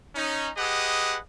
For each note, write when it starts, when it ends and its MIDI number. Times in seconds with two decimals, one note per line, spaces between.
0.15 0.49 61
0.15 0.49 63
0.57 1.18 67
0.57 1.18 68
0.57 1.18 71
0.57 1.18 75
0.57 1.18 78